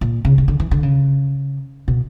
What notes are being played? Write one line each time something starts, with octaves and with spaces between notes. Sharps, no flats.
A#2
C#3
C#3
D3
E3
D3
C#3
B2